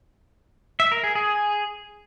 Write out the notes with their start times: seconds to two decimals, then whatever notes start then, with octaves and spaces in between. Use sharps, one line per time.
0.80 E5
0.92 A#4
1.04 G#4
1.15 G#4